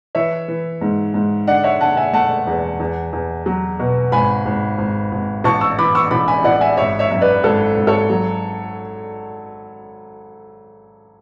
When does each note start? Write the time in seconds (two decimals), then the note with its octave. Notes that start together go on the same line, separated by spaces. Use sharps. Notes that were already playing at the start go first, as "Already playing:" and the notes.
0.15 E3 C#5 E5
0.48 E3
0.81 G#2
1.14 G#2
1.47 D3 D5 F#5
1.64 C#5 E5
1.81 D3 F#5 A5
1.97 E5 G#5
2.13 A3 F#5 A5
2.47 E2
2.80 E2
3.13 E2
3.46 F#3
3.80 B2
4.12 G#1 G#5 B5
4.46 G#1
4.78 G#1
5.12 G#1
5.44 A1 A5 C#6
5.61 C#6 E6
5.79 E3 B5 D6
5.95 C#6 E6
6.11 A1 B5 D6
6.28 G#5 B5
6.44 A1 D5 F#5
6.61 E5 G#5
6.77 G#1 C#5 E5
6.99 C#5 E5
7.10 F#2 E5
7.21 B4 D5
7.43 G#1 A4
7.77 G#1
7.87 A4 C#5
8.10 F#3